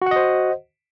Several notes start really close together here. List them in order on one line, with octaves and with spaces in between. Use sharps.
F#4 F#5 D#5 C5